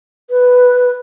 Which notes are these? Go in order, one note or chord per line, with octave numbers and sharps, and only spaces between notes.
B4